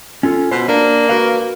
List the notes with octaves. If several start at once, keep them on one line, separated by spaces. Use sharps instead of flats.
C#4 F4 A4
B2 C5
A#3 D4
F#4 B4 F5